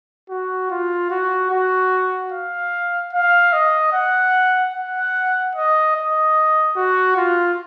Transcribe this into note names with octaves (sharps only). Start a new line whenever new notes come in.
F#4
F4
F#4
F#4
F5
F5
D#5
F#5
F#5
D#5
D#5
F#4
F4